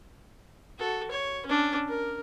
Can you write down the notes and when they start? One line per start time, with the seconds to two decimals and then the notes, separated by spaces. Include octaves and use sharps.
0.79 F#4 A4
1.11 C#5
1.46 C#4 D4
1.88 A#4